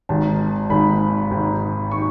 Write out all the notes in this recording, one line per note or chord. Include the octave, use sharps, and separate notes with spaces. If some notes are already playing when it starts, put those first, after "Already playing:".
G#1 G#2 D#3 A5
G#1 G#2 D#3 B5
G#1 G#2 D#3
D#3 C#6